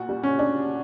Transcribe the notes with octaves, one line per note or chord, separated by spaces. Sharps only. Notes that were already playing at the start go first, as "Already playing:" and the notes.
Already playing: A#2 F#4
G3
C#4
D4